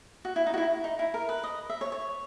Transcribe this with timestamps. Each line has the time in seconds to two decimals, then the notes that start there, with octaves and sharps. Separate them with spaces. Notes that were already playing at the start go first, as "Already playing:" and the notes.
0.25 F#4
0.36 E4
0.46 D#4
0.54 F#4
0.58 E4
0.84 D#4
0.99 E4
1.14 A#4
1.29 B4
1.44 D#5
1.69 E5
1.81 C#5
1.92 C#5